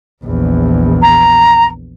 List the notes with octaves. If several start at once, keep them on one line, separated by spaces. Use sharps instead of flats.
A#1 E2
A#5